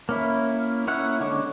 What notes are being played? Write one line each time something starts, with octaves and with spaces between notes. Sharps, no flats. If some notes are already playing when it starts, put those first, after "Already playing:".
A#3 C#4 E4
A#3 C#4 E4 F#5
D3 G#3 C#4 C#6 D6